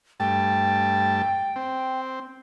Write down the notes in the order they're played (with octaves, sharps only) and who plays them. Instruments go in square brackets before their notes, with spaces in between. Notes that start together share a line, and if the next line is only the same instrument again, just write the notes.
[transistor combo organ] G2 A3 A5 [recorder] G5
[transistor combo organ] C4